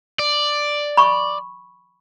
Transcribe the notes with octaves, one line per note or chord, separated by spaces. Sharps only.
D5
B5 C#6